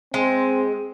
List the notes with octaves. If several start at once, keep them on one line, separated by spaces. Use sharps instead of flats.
G#3 C4